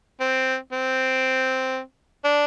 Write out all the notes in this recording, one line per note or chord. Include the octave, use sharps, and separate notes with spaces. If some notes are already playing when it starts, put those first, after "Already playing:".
C4
C4
D4